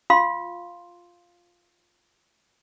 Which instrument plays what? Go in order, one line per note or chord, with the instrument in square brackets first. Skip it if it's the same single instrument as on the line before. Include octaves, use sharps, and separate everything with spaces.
[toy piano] F4 F5 C6